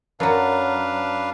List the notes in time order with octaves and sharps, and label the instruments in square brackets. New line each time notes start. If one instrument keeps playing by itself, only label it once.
[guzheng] F#2 F#3 [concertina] D4 B4 F5